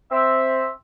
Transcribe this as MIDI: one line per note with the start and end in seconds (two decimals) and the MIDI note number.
0.12 0.68 60
0.12 0.68 76